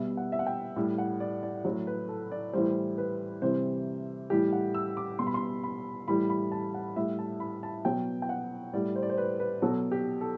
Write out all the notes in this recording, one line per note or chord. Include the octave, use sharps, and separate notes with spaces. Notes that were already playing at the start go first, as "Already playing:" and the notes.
Already playing: B2 G3 E5
F#5
E5
F#5
G5
A2 G3
F#5
D5
D5
A2 F#3
B4
A4
D5
A2 E3 G3 C5
B4
C3 E3 G3 C5
A2 E3 G3 G4
F#5
E6
D6
B2 G3 C6
B5
C6
B5
A2 E3 G3 B5
B5
A5
F#5
A2 G3 E5
A5
B5
A5
B2 F#3 G5
G5
F#5
A2 G3 D5
C5
D5
C5
B4
B4
B2 F#3 A4
G4
A4